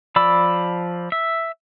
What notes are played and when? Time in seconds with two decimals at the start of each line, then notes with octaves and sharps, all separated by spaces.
0.16 F3 D5 B5 E6
1.12 E5